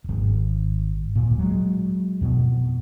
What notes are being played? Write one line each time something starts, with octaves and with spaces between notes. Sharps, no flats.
D#1 G#1
D1 A#2
F#3 G#3
F2 B2